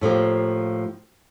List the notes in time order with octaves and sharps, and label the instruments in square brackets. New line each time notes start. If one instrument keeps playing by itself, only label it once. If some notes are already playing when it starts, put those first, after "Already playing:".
[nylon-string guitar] A2 F3 A#3 G4